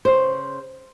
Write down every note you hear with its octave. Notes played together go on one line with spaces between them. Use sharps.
C#3 C5